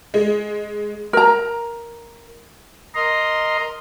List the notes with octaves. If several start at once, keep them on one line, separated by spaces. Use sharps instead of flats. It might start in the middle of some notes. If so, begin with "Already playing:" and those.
G#3
A#4 A#5
A#4 D#5 A#5 C6